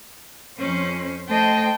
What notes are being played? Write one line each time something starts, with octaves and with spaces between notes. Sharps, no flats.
F2 C#4 C5
A3 C5 D#5 G5 A5